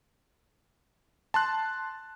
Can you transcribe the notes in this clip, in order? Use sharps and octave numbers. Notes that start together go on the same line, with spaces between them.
A5 C6 F#6